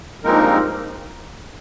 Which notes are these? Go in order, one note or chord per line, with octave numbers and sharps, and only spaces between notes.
G2 F3 G#3 A#3 C4 D#4 A#4